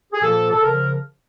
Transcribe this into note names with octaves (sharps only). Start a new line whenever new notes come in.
G#4
A#2 F3 A#3 A4
A4
C#3 F3 A#4